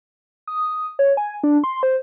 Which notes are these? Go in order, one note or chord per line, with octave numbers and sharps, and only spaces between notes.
D#6
C#5
G#5
D4
C6
C5